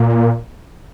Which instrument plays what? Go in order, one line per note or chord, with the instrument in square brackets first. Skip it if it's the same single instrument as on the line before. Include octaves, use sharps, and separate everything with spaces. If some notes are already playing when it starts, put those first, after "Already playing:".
Already playing: [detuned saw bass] A#2